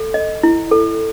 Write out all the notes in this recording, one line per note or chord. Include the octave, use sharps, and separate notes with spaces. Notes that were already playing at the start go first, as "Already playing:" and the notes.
Already playing: A4
D#5
E4
A4